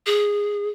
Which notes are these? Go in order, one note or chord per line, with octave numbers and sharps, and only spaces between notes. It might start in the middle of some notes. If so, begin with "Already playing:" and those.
G#4